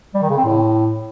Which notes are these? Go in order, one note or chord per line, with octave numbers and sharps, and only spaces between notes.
G3
D#3
C#3
C4
A2